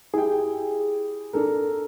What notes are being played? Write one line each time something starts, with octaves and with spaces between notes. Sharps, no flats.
E4 G4 G#4 G5
D4 A4 A#4